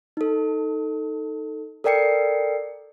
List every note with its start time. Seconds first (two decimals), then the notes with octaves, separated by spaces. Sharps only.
0.17 D#4 A4
1.84 A4 A#4 D5 G5 C7 C#7